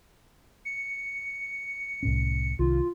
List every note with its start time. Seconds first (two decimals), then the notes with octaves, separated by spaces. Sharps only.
0.65 C#7
2.03 C2 A2 C#4
2.59 C2 D#3 F4